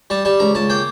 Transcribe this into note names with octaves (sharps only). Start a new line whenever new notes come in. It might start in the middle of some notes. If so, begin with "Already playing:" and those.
G3 A5
G3 A5
C#2 A#5
C#2 A5
A#3 G5